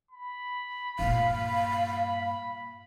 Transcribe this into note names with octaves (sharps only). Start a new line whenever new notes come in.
B5
G2 A#2 F5